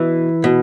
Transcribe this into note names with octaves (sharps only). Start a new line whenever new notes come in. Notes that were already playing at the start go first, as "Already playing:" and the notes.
Already playing: B2 E3 E4
B2